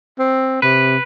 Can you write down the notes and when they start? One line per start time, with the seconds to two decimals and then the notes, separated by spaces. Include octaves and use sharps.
0.19 C4
0.62 C3 B4